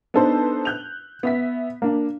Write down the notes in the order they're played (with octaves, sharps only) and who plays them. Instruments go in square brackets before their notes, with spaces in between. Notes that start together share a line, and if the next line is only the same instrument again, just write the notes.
[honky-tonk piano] B3 D4 D#4 A4 B4 C5
F#6 G6 F7
B3 E5 B6
A#3 D4